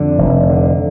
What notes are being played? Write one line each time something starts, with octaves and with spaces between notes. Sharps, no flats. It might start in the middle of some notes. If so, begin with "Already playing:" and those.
Already playing: F2 D3
F1
D3